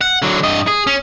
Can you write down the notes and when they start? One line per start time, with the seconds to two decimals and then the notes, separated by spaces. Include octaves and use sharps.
0.01 F#5
0.22 D3 F#3
0.43 G2 D#5
0.67 G#4
0.87 C#4